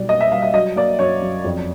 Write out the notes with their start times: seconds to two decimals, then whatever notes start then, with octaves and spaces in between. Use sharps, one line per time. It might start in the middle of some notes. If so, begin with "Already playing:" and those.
Already playing: B1 G3 D5
0.09 A#3 D#5
0.21 E5
0.32 G3 F5
0.42 E5
0.54 F#3 D#5
0.76 A#3 D5
0.99 F#2 C#5
1.22 F#2
1.45 F2